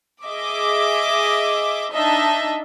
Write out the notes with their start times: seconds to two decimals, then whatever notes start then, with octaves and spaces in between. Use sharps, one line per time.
0.24 G#4 D#5 E5 D6
1.92 D4 D#4 D#5 E5 A5